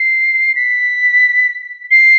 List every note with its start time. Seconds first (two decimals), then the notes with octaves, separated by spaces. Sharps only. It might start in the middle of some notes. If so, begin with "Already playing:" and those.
Already playing: C7
0.56 B6
1.91 C7